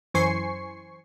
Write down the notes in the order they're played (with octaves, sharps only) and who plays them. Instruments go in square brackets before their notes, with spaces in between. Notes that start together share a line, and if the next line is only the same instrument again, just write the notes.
[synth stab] F#2 E3 C5 G#5 C#6 C7